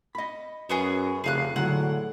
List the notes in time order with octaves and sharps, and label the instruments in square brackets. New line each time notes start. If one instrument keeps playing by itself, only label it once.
[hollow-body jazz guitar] D#5 B5
[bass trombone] F#2 [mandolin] B3 C#4 G#4
[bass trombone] F1 [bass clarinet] C#3 [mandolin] G#4 F5 F#6
[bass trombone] A2 [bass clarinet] D3 [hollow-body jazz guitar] F#3 G#3 [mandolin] F#5